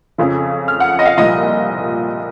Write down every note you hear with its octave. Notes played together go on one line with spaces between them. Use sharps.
F2 C#3 F3
F6
F#5
D#5
F5
C2 A#2 F3 D#5